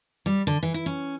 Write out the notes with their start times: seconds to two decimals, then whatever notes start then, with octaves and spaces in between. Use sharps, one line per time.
0.26 G3
0.47 D3
0.63 E3
0.74 E4
0.86 C#4